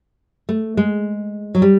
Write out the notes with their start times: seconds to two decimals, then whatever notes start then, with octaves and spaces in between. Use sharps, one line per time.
0.49 A3
0.77 G#3
1.55 F#3
1.62 G3